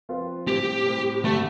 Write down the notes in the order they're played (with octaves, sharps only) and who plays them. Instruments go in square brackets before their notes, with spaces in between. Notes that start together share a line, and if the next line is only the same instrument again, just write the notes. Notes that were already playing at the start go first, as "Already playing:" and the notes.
[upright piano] F3 C4 F4 B4
[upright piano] A2 G3 C4 [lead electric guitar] G4
[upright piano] A2 G3 C4
[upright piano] G2 D3 G3 C4 G4 [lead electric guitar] A3